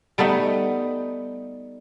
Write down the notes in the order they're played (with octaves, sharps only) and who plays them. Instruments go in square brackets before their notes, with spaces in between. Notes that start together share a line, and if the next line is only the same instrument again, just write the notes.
[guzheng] G3 A3 B3 D#4